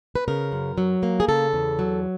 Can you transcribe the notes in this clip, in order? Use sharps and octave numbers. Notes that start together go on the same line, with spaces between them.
B4
C#3 A#4
F#2
F#3
A#3
G#4
C#3 A4
E2
F#3